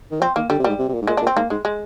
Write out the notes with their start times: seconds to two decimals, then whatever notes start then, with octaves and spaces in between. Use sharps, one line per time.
0.11 D#3
0.21 F3 C4
0.36 D#3 A#3
0.50 D3 G3
0.60 C3
0.64 A#2 G3
0.69 G#2
0.79 C3
0.89 C3
0.94 A#2
1.02 G#2
1.07 A#2 G#3
1.17 D4
1.22 A#2
1.27 C4
1.36 G#2 A#3
1.50 G#2 G#3
1.65 G#3